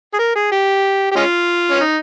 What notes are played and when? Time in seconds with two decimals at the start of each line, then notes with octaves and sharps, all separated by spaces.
0.14 G#4
0.19 A#4
0.35 G#4
0.51 G4
1.11 G4
1.16 G#3 C#4 F4
1.71 C#4
1.80 D#4